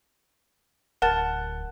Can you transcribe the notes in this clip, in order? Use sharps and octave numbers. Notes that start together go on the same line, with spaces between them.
D1 A#4 F#5 A5 A6